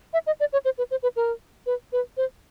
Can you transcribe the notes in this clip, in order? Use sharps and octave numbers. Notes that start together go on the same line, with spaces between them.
E5
D#5
D5
C#5
C5
B4
C5
B4
A#4
B4
B4
C5